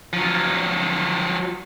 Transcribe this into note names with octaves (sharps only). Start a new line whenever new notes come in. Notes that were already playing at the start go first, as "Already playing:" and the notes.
F3 F#3